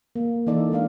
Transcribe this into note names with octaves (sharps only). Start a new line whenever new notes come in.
A#3
E3 A#3 D#4 A4 D5
G#3 D4 F5